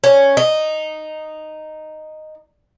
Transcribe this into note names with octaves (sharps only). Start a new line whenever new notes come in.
C#4
D#4